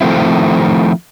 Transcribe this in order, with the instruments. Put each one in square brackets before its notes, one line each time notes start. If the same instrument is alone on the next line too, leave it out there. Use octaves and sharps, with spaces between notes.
[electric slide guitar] D#3 F3 A3 C4 E4